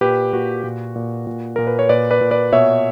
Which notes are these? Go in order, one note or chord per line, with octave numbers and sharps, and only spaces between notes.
A#2 G4 B4
A#2 F#4
A#2
A#2
A#2
A#2 A#4
B4
C#5
A#2 B4 D5
B4 D5
A#2
B4 D5
B2 C#5 E5